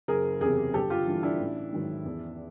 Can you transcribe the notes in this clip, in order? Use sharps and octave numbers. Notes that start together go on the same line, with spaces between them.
F#1 G#4 A#4
E2 C3 G#4 A#4
G1 G4 A4
F4 G4
G2 E3
D4 E4
A1
G#2 D#3 F#3
E2